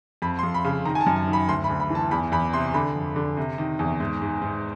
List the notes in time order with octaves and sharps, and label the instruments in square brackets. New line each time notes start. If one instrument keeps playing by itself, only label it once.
[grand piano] F2 B5
C6
F2
B5
C#3
D#3 A#5
G#5
A5
F#2
A5
D#3
B5
D2 C6
B5
D2
B5
E3 A5
E2 B5
E2 B5
C3 C6
D3 B5
F2
D3
C3
D#3
E2
G#2
G#2
G#2